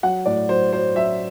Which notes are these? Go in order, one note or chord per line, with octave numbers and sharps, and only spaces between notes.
F#3 F#5
A2 D5
F#3 C5
F#3 C5
F#3 E5